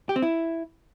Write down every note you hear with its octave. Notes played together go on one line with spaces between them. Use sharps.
G4
C4
E4